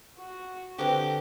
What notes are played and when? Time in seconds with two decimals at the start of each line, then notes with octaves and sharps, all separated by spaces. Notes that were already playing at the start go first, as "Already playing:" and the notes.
0.18 F#4
0.78 D3 C4 G4 B4 A#5